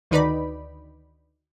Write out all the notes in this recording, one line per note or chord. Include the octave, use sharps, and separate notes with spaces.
D2 D#3 D#4 B4 D5 B5